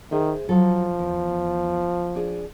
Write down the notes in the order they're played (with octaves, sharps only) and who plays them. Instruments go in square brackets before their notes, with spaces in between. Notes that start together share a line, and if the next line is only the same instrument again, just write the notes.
[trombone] D#3 [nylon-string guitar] G#4 C5 E5
[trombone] F3 [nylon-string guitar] F#3 A4
[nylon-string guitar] E2
D4 G#4 D5